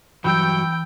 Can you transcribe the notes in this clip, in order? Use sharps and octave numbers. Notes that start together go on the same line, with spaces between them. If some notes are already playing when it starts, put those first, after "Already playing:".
G2 E3 F#3 G5 B5 E6 G6